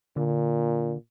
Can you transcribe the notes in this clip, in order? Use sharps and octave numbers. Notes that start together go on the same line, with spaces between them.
A#2 D3